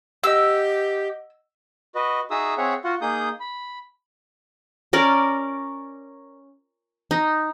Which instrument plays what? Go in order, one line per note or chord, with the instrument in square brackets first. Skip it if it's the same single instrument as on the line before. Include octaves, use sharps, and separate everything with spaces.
[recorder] G4 [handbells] D#5 F#5 [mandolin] E6
[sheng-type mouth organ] F#4 B4 D#5
D#4 F#4 G#4 E5 D#6 E6
C4 G#4 C#5 E5 F#5
F4 F#4 F#5
A#3 D#4 G#4 D#6 G6
B5
[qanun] C#4 A#4 D5
D#4